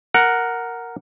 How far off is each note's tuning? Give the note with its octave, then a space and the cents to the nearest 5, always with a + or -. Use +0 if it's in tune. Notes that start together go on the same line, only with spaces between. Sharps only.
A#4 +0 F#5 +0